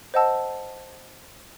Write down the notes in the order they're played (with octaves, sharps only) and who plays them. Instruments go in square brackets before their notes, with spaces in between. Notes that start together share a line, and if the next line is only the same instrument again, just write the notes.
[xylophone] C5 D#5 F#5 A5 E6